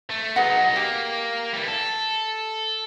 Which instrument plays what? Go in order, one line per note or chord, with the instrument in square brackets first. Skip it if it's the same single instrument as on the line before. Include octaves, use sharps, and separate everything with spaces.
[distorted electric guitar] A3
[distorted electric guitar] F#3 D#4 [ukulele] G#4 B4 F#5
[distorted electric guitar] A#3 [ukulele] G4
[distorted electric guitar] E3 G3
A4